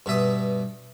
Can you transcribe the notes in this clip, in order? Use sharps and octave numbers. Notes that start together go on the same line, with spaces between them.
G2 B2 E5 D#6